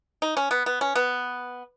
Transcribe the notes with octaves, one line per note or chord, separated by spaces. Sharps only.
D#4
C#4
B3
B3
C#4
B3